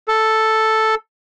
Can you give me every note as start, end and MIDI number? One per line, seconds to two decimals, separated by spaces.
0.08 0.95 69